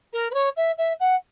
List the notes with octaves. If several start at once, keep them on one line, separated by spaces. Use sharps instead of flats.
A#4
B4
C#5
E5
E5
F#5